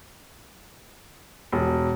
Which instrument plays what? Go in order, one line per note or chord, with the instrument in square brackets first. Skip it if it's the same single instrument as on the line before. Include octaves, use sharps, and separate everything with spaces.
[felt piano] E1